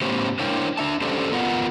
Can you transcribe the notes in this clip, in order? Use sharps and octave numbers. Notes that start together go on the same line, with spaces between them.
A2 B3 C#4 G4 C5
D4 E4 A#4 C5 C#5 G5
D4 E5 A5
C#4 G4 A4 C5 D5
B3 F4 A#4 B4 F#5